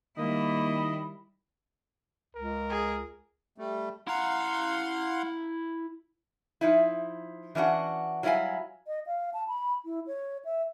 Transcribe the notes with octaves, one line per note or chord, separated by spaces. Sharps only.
D#3 G3 A#3 E4 D#5
C#2 A#4
G#4
G3 A3
E4 F5 F#5 A#5 C6
F3 D#4 E4
E3 C#4 D4 F#4 F#5
F#3 G3 E4 B4 F5 G#5
D#5
F5
A5
B5
E4
C#5
E5